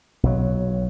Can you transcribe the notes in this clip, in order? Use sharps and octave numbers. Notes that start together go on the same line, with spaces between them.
B1 F#3